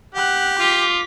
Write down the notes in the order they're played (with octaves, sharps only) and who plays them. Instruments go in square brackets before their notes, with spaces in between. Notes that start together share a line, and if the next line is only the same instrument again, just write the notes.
[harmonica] G4 [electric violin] F#5 F#6
[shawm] F4 [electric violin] D6 B6